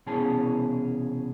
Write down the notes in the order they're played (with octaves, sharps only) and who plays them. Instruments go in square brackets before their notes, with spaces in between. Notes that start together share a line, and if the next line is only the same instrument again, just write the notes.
[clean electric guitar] C2 B2 E3 C#4 G#4 A5